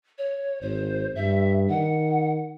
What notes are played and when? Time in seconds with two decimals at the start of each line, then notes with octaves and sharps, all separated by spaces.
0.18 C#5
0.61 G#1 C5
1.16 G2 E5
1.69 D#3 F#5